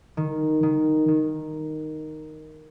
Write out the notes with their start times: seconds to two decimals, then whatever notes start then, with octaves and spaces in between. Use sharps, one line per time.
0.17 D#3
0.63 D#3
1.08 D#3